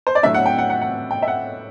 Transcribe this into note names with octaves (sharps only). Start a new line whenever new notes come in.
C5
D5
A2 F#3 A3 D4 E5
F#5
G5
F#5
F#5
F#5
G5
E5
F#5